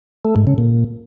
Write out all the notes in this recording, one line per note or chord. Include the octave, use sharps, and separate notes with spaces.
A3
G#2
C#3
A#2